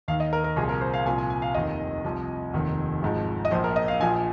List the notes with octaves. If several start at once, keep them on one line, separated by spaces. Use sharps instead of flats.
D#2 D#3 F5
D#5
A#4
A#4
C2 A#2 F3 G#4
A#4
C5
F5
C2 A#2 F3 G#5
G#5
G#5
F5
F1 D#2 D#3 D#5
C2 C3 F3
F1 D#2 D#3
G#1 G#2 F3
D#5
A#1 A#2 F3 C5
A#4
D#5
F5
A#1 A#2 F3 G#5